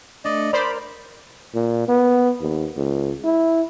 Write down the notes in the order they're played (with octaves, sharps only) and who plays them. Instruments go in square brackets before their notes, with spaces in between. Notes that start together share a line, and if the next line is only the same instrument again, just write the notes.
[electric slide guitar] A3 D4 [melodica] D5 D#5
[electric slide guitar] A#4 [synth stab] C5 D5 [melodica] B5
[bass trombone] A#2
B3
D#2
C#2
E4